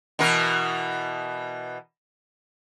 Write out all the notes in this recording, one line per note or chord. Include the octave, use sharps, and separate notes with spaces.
B2 E3 A#4